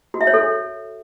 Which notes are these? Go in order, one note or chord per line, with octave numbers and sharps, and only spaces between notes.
F#4
E5
C#5
A4